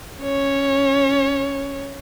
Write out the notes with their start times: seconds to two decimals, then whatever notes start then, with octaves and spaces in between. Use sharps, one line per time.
0.22 C#4 C#5